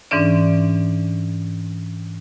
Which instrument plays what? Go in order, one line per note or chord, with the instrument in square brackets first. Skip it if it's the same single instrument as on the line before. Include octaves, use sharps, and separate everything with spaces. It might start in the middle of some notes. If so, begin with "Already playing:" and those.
[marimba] G#2 E3 C#4 D4 D5